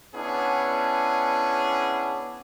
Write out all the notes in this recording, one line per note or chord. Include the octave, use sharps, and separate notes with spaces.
B3 C#4 D4 E4 G#4